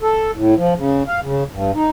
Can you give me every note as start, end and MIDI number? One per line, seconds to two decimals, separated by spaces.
0.01 0.31 69
0.36 0.54 45
0.57 0.74 53
0.77 1.03 49
1.08 1.20 77
1.23 1.44 49
1.52 1.71 43
1.75 1.90 63